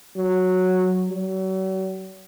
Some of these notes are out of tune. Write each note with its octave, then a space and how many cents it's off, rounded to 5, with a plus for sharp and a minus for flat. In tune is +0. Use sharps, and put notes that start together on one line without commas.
F#3 -5
F#3 +40